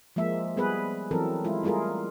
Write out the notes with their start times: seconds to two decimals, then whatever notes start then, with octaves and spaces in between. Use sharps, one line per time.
0.16 F3 G#3 A#3 E5
0.57 G3 B3 G#4 B4
1.11 E3 F#3 C4 A4 A#4
1.44 G#3 E4 F4
1.63 G3 A3 F4 G#4 A#4